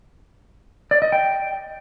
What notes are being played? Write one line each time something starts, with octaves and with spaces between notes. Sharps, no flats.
D5
D#5
G5